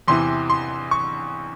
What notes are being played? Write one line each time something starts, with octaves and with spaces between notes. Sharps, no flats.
E2 C3 E3 C6
C6
C#6